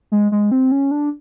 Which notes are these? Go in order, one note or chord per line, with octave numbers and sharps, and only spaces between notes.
G#3
G#3
C4
C#4
D4